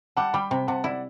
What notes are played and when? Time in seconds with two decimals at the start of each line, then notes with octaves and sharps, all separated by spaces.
0.17 G3 F#5 A5
0.33 G3 G5 B5
0.51 C3 G5 B5
0.67 C3 F#5 A5
0.84 E4 D5 F#5